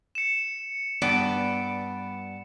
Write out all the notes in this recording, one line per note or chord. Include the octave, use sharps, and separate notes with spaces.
C#7 E7
G2 B3 D5